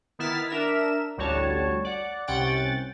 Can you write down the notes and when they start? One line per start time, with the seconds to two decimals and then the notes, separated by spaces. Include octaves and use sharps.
0.19 D#3 B3 E4 F6 A6 B6
0.50 D4 A#4 E5 E7
1.17 A1 D2 G3 F#4 C#5 A5
1.84 D5 F#5
2.27 C2 C3 C#4 F#5 G5 A6